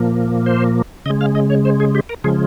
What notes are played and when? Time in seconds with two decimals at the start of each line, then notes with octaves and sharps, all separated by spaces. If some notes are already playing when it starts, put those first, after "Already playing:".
Already playing: A#2 F3 A#3
0.46 C5
1.06 C#3 G#3 D#5
1.21 F5
1.35 D#5
1.50 C#5
1.65 C5
1.80 G#4
1.95 G4
2.09 A#4
2.24 C#3 F3 G#3 G#4